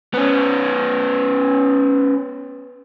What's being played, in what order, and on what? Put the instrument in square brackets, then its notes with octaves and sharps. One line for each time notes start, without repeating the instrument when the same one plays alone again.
[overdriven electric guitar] B3 C#4